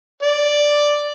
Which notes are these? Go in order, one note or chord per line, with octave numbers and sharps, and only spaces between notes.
D5